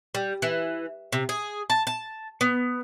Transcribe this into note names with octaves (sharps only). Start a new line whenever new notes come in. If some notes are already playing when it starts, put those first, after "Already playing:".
G3
E3
C3
G#4
A5
A5
B3